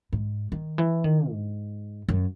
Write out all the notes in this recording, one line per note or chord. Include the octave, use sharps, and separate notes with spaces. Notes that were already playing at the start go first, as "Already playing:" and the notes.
G#2
D#3
E3
D#3
G#2
F#2